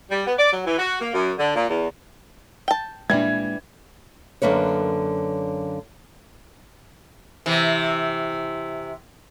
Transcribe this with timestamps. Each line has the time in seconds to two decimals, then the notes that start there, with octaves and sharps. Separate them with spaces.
0.10 G3
0.26 B3
0.37 D5
0.52 F#3
0.65 E3
0.78 F#4
1.00 A#3
1.13 F#2
1.37 D3
1.55 A#2
1.69 E2
2.68 G5 A5
3.10 A#2 E3 G3 G#3 D4 E5 G#6
4.42 F#2 D3 A#3 B4 C#5
7.46 C3 E3